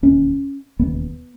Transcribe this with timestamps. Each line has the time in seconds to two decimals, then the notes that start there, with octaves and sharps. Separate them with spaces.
0.03 E1 D#2 C#3 C#4
0.79 E1 D#2 C#3 B3